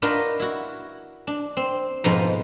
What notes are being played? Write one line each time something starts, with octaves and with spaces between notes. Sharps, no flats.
D4 D#4 F4 F#4 A#4 B4
E4 F#4
D4
C4
F2 G#2 B2 F3 D#4 B4